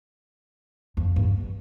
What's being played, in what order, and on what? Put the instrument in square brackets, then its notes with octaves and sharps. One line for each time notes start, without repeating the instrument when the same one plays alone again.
[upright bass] F2
G2